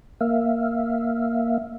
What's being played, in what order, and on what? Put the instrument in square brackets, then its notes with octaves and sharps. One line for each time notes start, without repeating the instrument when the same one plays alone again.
[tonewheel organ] A#3 E5 F5